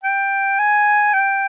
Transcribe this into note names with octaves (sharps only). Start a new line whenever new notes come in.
G5
G#5
G5